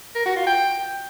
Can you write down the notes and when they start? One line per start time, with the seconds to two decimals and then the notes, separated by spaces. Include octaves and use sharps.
0.15 A#4
0.26 F#4
0.36 F4
0.47 G5